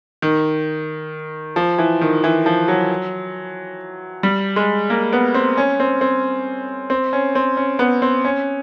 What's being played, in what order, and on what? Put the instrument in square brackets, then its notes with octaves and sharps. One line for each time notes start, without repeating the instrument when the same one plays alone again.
[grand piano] D#3
F3
E3
D#3
E3
F3
F#3
G3
G#3
A#3
B3
C4
C#4
C4
C4
C4
C#4
C4
C#4
B3
C4
C#4